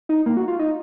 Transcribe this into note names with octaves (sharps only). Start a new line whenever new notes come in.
D#4
A#3
F#4
F4
D#4